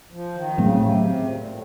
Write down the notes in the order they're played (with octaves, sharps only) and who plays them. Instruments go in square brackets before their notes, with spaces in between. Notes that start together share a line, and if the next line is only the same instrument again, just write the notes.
[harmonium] F3
D#3
C3
[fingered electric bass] A2 F#3 A3 C4 [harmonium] C#3
[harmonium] C3
C3
A#2
A#2
A2